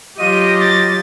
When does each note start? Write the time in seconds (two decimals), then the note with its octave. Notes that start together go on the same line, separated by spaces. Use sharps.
0.19 F#3 F4 G4 D#5 D#7
0.60 A6